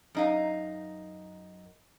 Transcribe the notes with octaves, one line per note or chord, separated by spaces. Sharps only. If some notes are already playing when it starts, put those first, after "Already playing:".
F#2 D#4 F5